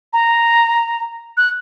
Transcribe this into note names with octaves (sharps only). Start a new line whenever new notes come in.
A#5
F#6